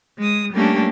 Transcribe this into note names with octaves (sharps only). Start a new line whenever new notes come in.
G#3 D#6
G3 A3 A#3 C#4 D4 G4